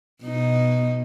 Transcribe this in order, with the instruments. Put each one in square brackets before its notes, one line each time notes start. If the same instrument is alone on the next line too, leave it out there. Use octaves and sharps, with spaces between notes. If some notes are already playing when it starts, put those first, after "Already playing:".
[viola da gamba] B2 D#4